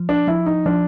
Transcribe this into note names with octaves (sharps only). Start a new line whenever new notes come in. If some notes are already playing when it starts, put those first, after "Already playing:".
Already playing: F3
D4
F3 E4
D#4
F3 D4